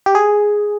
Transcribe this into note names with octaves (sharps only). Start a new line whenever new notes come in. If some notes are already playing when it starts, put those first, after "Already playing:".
G4
G#4